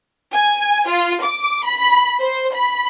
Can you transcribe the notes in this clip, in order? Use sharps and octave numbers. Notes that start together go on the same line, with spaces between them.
G#5
F4
D6
B5
C5
B5